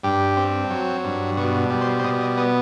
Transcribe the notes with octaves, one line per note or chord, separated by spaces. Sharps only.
G2 G4
C4
F#3
G2
B2 F#4
G3
C5
C5
B2 D#5
D#5
B3 D#5